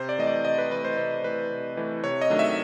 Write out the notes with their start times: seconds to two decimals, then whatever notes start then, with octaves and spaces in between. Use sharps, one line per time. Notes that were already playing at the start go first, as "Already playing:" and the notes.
Already playing: C3 C5
0.09 D5
0.18 E3 A3 D#5
0.27 D5
0.45 C3 D#5
0.58 B4
0.71 E3 A3 B4
0.84 C5
0.97 C3 C5
1.24 E3 A3 B4
1.51 C3
1.77 E3 A3
2.04 C3 C#5
2.21 D#5
2.30 D#3 F#3 A3 D4
2.39 E5